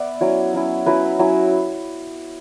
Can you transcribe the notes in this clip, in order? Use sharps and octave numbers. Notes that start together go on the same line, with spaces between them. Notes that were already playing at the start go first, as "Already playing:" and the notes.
Already playing: B3 D5 E5
F#3 C#4 E4 C#5
F#3 C#4 E4
F#3 C#4 E4 B4
F#3 C#4 E4